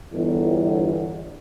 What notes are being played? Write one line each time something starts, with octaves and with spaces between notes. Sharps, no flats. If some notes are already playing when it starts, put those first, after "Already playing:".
G1 E2